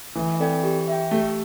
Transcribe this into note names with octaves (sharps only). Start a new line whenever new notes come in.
E3 A3
C4 A4 D5 G5
G4
E5 G5
A3 G4